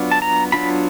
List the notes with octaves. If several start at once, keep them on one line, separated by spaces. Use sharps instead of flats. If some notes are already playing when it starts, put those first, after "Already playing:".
Already playing: F#3 B3 D4 F4
A5
A#5
F#3 B3 D4 F4 B5